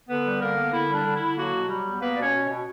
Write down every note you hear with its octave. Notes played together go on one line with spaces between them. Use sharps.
D3 B3 B4
G3
D3 A#3 A#4
B3
D3 E4
G3
D4
D3
E4
D3
F#3 A#3 F#4
B2
F#3 G3 G4
E2
A#3 B3 B4
B2 D5
C#4 C#5
B2
B2